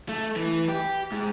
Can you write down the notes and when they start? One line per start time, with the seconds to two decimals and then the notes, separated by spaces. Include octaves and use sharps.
0.09 A3
0.36 E3
0.69 G4
1.12 G#2